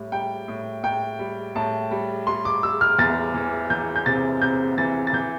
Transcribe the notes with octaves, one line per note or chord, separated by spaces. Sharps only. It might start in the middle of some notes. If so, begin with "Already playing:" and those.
Already playing: A2 G3
G3 G5
A2
A2 G5
G3
A2 A5
G3
G3 C6
D6
G3 E6
F6
E2 A6
E3
E3 G6
G6
C3 A6
C3 G6
E3 A6
A6
E3 G6